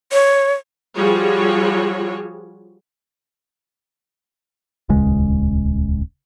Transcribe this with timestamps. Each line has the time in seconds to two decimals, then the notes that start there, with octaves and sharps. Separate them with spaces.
0.12 C#5
0.96 F3 G3 F4 F#4 G#4 C#5
4.89 D#1 C#2 C#3 G#3